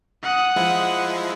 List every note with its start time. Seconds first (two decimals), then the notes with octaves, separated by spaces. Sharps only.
0.23 F#5 D#6
0.56 F3 G#3 E4